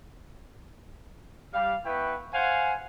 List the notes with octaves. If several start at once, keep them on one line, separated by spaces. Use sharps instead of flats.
G3 F5
B3 E4 B4 G5 C#6
C5 F5 F#5 G#5